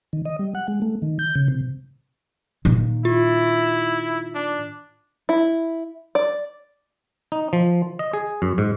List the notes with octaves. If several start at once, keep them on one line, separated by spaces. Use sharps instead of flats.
D#3
D#5
G3
F#5
G#3
A3
D#3
G6
C#3
C3
A#2 D#3
E4 F4
D4
E4
D5
D#4
F3
D#5
G#4
F#2
G#2